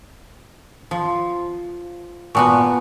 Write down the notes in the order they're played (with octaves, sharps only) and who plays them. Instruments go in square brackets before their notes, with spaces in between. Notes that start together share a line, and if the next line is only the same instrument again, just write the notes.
[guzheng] F3
[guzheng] A#2 B3 F#4 [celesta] G#5 A5 C#6